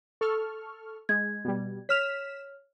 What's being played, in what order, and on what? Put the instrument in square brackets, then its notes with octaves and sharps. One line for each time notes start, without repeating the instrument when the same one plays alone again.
[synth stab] A4 C#6 F6
[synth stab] G#3 [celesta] G#6
[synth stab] B2 G3
[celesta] C#5 F6 F7 [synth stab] B6 E7